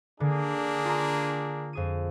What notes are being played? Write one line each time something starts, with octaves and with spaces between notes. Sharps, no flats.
D3 A#3 D4 G#4
F4 A#5
F2 G#4 D#7